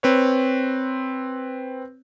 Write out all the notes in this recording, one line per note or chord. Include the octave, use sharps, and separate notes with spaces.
C4 B4 C#5